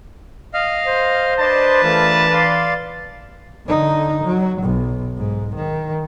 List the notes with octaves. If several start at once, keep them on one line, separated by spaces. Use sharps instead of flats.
D#5 F5 F6
C5
D4 B4 D5 D#5 A5 C6
E3 A3 F4 A#4
D5 F5 C6
D3 D#4
F#3
B1
G#2
D#3